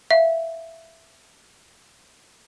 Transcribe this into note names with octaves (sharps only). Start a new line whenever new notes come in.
E5 F5